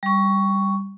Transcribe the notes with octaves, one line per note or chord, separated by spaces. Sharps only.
G3 C#6